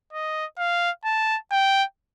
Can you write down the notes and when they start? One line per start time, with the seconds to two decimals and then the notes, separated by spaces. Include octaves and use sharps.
0.13 D#5
0.58 F5
1.05 A5
1.51 G5